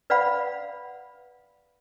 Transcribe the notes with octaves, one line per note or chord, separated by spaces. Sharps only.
B4 D5 F5 F#5 B5